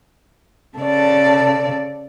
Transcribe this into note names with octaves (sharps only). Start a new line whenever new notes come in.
C#3 A4 D5